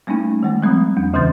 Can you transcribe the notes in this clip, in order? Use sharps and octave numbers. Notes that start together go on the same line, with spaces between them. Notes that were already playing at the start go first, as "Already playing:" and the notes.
G3 A3 A#3 C#4 D#4
D#3 G#3 A3
F3 G3 C4 B5 D#6
E2 C#4
D2 C#3 E3 C6 G6 A6